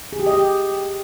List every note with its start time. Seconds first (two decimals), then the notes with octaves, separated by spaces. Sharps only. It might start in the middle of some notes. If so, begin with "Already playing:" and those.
0.13 G#4
0.20 G4
0.26 D#5
0.33 G4